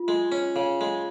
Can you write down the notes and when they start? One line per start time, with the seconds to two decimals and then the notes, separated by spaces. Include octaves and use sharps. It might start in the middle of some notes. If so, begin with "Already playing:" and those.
Already playing: F4
0.08 G#3
0.32 C#4
0.56 C#3
0.81 G#3